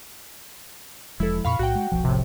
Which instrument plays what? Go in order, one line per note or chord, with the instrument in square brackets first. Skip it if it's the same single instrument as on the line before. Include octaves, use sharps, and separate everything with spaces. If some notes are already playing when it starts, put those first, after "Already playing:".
[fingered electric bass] E1 F3 G#3 [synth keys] E4 A4
[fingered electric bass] F2 A#2 [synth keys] F5 B5 C#6
[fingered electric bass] B1 A2 [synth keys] F#4 F#5 G5
[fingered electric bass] G#3
E1 B1 F3
[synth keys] A2 C3